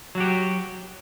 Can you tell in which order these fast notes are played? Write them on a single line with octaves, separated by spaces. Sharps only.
F#3 F#4 G4